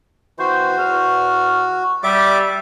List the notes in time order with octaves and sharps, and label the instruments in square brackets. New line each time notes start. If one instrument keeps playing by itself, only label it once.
[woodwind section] E3 C4 C5 [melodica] F#4
[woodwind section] E2 F6
[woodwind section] G3 [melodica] E5 D6